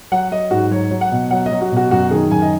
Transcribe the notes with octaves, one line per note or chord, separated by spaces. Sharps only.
F#3 F#5
F#3 D#5
G#2 F#4
F#3 C#5
F#3
F#5
B2
F#3 F#5
D#5
F#3
F#4
B2 F#4
F#2 F#4
D#3 G#4
F#2 G#5
D#5